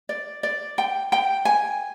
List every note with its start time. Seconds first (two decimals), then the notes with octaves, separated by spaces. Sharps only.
0.09 D5
0.43 D5
0.78 G5
1.12 G5
1.45 G#5